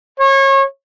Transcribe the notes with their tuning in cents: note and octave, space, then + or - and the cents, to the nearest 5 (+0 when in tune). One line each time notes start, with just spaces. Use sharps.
C#5 -30